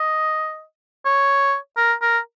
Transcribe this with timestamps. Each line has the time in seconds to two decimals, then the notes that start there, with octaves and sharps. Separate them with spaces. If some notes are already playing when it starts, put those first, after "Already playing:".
Already playing: D#5
1.05 C#5
1.77 A#4
2.02 A#4